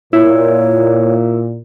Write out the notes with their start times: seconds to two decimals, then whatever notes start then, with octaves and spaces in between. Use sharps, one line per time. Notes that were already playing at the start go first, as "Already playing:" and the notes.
0.13 A#2 E4 C#5